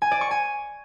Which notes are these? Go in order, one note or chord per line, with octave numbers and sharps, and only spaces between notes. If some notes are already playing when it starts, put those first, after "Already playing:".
G#5
D5
C#6
G#5